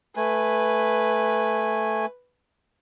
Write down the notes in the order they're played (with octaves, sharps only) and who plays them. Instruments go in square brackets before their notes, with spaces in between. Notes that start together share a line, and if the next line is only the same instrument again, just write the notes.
[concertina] A3 G#5 [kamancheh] B4